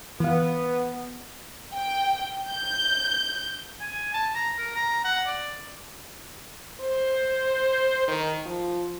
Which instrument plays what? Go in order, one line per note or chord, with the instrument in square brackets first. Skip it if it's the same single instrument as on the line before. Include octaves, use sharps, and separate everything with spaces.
[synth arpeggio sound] E3 F5 [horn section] B3
[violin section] G5
G6
[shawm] G#5
A5
A#5
A#4
A#5
F#5
D5
[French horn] C5
D#3
F3